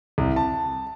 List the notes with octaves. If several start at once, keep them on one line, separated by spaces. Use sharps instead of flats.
C2
A5